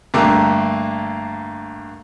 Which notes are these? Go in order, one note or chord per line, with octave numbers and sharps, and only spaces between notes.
G2 D3 A3 A#3